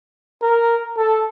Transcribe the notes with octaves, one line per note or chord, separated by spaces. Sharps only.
A#4
A4